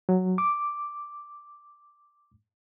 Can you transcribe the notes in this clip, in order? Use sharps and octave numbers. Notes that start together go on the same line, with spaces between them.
F#3
D6